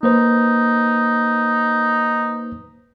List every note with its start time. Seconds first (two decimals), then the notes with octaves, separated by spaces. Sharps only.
0.03 A#3 D#4 B4 C5